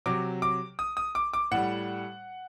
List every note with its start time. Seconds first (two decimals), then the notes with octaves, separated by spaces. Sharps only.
0.06 C3 F#3 D6
0.42 D6
0.79 D#6
0.97 D#6
1.15 D6
1.33 D6
1.51 A2 G3 F#5